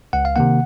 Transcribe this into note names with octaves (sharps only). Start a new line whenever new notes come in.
C#2 F#5
F5
C3 D#3 A#3 F#5